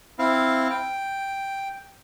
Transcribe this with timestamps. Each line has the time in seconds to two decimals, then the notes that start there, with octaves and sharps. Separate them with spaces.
0.19 C4 E4 F5
0.70 G5